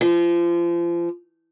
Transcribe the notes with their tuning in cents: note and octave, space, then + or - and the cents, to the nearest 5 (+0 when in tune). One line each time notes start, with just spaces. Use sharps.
F3 -30